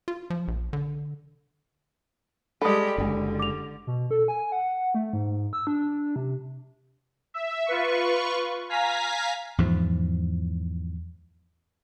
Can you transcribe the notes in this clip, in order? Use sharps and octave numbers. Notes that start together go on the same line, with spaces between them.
F4
F3
A#1
D3
G3 G#3 G4 A4 B5 D#6
F#1 D3 G#3
D6 F7
B2
A4
G#5
F#5
A3
G#2
E6
D4
C3
E5
F4 B4 C#6
F5 G#5 A#5 B6
E2 G#2 F3